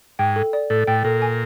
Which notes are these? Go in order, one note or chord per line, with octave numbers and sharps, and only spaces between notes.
G#2 G5
A4
D5
A2 A4
A2 G5
A#2 A4
G#5